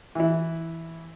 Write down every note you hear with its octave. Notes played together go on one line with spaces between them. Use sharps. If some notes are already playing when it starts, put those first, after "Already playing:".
E3 E4